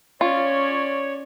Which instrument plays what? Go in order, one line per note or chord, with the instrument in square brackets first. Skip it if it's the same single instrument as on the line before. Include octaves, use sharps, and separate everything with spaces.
[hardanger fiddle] C#4 D5 [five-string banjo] F4 [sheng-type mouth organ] C#5